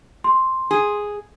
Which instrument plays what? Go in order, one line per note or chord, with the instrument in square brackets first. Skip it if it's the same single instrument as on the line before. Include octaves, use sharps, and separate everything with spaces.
[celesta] C6
[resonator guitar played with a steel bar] G#4